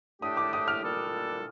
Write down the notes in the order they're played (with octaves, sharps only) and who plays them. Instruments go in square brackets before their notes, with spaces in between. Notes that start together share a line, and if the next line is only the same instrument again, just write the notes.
[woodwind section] A2 A3 D4 G4 [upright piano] D#6
[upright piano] D6
D#6
F6
[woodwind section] A#2 G3 D4 A4